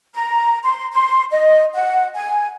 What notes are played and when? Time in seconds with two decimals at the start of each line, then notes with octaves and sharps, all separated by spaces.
0.14 A#5
0.63 C6
0.92 C6
1.31 D#5
1.74 F#5
2.15 G#5